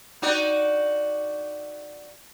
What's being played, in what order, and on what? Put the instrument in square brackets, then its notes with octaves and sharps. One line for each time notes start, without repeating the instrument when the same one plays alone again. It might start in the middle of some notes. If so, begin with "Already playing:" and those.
[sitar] D#4 F#4 D5